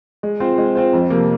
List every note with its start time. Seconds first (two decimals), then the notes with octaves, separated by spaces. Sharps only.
0.23 G#3
0.40 C4 F4 C5
0.58 G#3
0.75 C4 F4 C5
0.93 F2
1.10 C3 F3 A#3